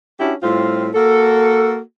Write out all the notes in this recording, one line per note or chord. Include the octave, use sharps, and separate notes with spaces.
C#4 D4 E4 F#4 G4
A2 G3 C4 F4
A#3 F#4 A4